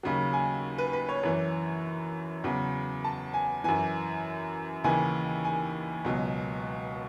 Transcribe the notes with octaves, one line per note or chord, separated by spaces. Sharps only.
D#2 C#3 F#3
G#5
B4
B4
C#5
F#2 E3 C#5
E2 C#3 F#3
A5
G#5
F#2 E3 G#5
D#2 C#3 E3 G#5
G#5
C#2 B2 F#3